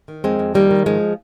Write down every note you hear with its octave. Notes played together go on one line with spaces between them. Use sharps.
D#3
F2 G#3 C4
F2
D#3 G3 A#3
D#3
G#2 F3 G#3